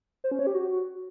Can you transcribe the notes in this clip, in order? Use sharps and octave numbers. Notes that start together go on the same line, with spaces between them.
C5
C#4
C#5
G4
F#4